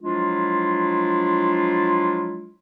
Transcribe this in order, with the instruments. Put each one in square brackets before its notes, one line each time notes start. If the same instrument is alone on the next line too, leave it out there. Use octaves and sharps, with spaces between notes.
[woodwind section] F3 F#3 G#3 D4 E4 F4